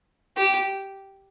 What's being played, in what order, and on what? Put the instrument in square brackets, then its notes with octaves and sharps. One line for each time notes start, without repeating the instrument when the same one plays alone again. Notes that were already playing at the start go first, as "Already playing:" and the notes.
[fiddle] G4